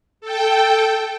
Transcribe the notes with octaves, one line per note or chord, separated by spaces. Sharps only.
A4 G5